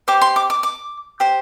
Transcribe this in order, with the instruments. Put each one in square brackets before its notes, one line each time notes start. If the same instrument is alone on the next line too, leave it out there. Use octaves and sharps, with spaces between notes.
[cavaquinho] G4 C5 D6
C6
D6
D6
D6
G4 C5